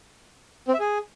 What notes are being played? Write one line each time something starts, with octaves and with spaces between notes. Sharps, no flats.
C4
E5
G#4